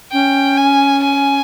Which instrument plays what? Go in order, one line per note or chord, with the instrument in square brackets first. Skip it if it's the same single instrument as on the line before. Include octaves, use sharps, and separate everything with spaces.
[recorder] C#4 [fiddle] G5
[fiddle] G#5
G#5